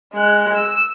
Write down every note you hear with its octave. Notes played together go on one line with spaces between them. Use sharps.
G#3 F#6
E6